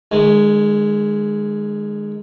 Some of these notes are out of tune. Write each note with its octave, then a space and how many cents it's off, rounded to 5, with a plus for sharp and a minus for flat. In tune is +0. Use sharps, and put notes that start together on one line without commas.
D#3 -45 G#3 +0